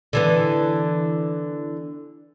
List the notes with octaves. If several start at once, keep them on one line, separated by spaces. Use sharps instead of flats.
D3 E3 B3